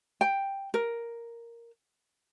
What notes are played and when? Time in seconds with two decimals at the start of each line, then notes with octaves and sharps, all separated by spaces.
0.21 G5
0.74 A#4